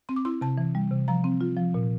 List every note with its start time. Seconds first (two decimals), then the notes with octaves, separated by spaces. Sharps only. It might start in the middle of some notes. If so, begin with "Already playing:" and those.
0.09 C4 C6
0.16 D6
0.25 E4 C6
0.41 C3 A5
0.58 E3
0.75 G3
0.91 C3
1.08 F3 A#5
1.24 C4
1.41 F4
1.57 F3
1.74 A#2